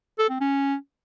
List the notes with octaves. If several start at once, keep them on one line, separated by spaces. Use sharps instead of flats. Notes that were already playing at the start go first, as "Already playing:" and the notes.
A4
C4
C#4